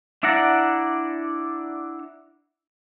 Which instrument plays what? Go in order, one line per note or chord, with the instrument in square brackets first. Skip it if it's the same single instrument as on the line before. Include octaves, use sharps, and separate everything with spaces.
[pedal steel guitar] D4 E4 D5 F#5 A#5